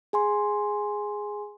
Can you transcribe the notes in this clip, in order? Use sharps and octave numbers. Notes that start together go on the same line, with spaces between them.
G#4 G#5 C6